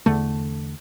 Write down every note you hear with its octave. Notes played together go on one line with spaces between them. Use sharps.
E2 D3 A3